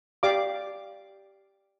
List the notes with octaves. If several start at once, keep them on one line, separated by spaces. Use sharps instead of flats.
G4 D5 F5 D6